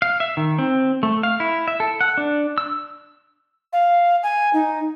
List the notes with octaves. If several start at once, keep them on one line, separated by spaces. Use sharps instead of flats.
F5
E5
D#3
C4
A3
F5
E4
E5
A4
F#5
D4
E6
F5
G#5
D#4